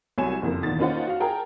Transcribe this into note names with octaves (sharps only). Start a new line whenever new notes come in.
C2 F#3 C#5 G#5 E7
F#1 F2 A#3
E2 A#2 D#3 A6
A#3 C#4 D#4 F4 C5 F#5
F#4 F5
G#4 A#4 G5 A5 A#5